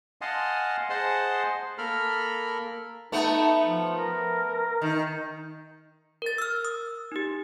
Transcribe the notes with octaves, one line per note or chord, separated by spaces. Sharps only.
D#5 F5 F#5 G#5 A5 C6
G#4 C5 D#5 F#5 A5 C6
A#3 A4 A#4 B5 F6
A3 B3 D#4
F3
A#4
D#3
A#4 A6
E6 F6
D#6
D#4 G4